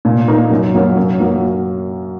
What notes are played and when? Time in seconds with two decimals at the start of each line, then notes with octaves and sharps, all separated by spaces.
0.05 A#2
0.28 A#3 D#4
0.51 F#2
0.74 F#3 A#3 C#4
0.97 F#2
1.20 F#3 A#3